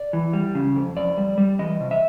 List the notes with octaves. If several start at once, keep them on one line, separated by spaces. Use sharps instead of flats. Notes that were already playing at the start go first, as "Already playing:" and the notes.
Already playing: D5
E3
G3
C#3
F2
F2 D5
G3
G3
E3 D#5
C3
E5